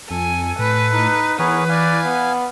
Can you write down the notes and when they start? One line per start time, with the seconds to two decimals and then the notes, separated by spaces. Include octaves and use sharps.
0.10 F2 A4 G#5
0.59 A2 B4
0.92 D#4
1.39 E3 B3 G#4 A#4 B4 C#5
1.69 D5 F5 G#5
2.05 B3